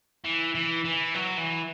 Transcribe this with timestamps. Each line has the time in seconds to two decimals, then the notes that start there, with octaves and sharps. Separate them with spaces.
0.24 E3
0.55 E3
0.85 E3
1.14 F#3
1.38 E3